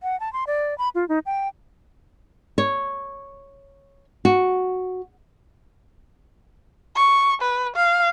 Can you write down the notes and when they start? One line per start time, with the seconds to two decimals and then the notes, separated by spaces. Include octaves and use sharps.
0.03 F#5
0.20 A5
0.33 C6
0.47 D5
0.78 B5
0.95 F4
1.09 D#4
1.26 G5
2.58 C#5
4.25 F#4
6.96 C#6
7.42 B4
7.76 F5